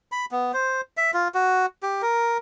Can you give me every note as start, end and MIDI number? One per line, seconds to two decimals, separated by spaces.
0.12 0.26 83
0.31 0.52 59
0.54 0.81 72
0.97 1.11 76
1.14 1.28 65
1.34 1.66 66
1.83 2.02 67
2.02 2.38 70